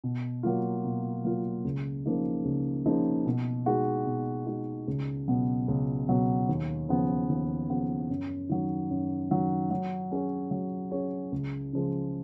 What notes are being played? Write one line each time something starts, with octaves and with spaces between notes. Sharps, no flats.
B2
F#3 A#3 F4
B2
F#3 A#3 F4
C#2
C#3 F3 A#3 D#4
C#2
C#3 F3 A#3 D#4
B2
G#3 D#4 F#4
B2
G#3 D#4 F#4
C#2
B2 F#3 B3
C#2
B2 F#3 B3
D#2
C#3 F3 B3
D#2
C#3 F3 B3
F#2
D#3 F#3
F#2
D#3 F#3
F#3
C#4 G#4 C#5
F#3
C#4 G#4 C#5
C#2
C#3 F3 G#3